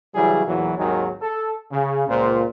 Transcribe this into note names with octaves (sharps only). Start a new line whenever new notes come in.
C#3 E3 F#3 G3 E4 G#4
E2 A#2 E3 F#3
G#1 D#2 D#3 F#3 G#3
A4
C#3
C#2 A#2 C5